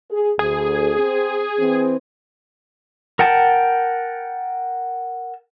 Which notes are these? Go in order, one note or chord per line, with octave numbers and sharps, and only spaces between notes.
G#4
D2 G#4
C4
E3 C4
A#4 F#5 G5 A5